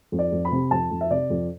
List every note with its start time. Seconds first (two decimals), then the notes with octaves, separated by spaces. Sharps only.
0.12 F2
0.19 D5
0.32 F2
0.45 B5
0.52 C3
0.71 F2 A5
0.91 F2
1.01 E5
1.10 C3 D5
1.30 F2